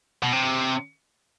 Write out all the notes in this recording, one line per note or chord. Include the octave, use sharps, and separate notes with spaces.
B2
C3